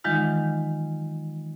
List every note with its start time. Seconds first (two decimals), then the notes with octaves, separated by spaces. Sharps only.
0.04 D#3 E3 F#3 G#3 D#4 F4